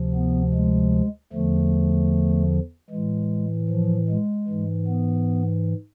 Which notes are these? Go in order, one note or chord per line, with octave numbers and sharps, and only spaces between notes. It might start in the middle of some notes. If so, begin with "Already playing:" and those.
Already playing: D2 C3 F3
B3
G#3
E2 D3 F3 A3
A2 E3 G#3
F3
G#3
G#2 E3
B3